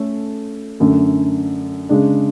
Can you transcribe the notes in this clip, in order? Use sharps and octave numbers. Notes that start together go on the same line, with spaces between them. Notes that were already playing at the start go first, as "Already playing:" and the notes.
Already playing: A3 C#4 A4
F#2 D3 A3
C#3 G#3 D4